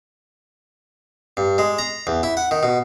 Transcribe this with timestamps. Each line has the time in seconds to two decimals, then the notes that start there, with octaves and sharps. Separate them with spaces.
1.37 G2
1.58 G#3
1.79 A#5
2.07 E2
2.23 E4
2.37 F#5
2.51 D#3
2.63 B2